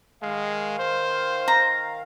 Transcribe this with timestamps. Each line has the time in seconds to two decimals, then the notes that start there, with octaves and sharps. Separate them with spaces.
0.22 D#3 G#3 F5
0.79 C5
1.48 A#5